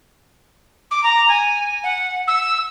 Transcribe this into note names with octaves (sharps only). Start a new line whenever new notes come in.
D6
A#5
G#5
F#5
E6